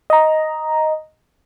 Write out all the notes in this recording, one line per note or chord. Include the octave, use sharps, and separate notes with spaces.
D#5 A#5